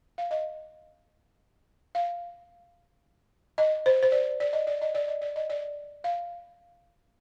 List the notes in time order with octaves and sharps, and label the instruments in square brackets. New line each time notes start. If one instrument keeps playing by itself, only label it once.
[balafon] F5
D#5
F5
D#5
C5
C5
D5
D5
D#5
D5
D#5
D5
D#5
D5
D#5
D5
F5